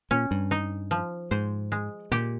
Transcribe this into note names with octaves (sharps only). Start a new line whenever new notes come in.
A#2 C#4
G2
D#4
F3
G#2 C5
G#3
A#2 G4